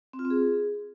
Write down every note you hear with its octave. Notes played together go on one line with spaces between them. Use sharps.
C4
F4
C4
G#4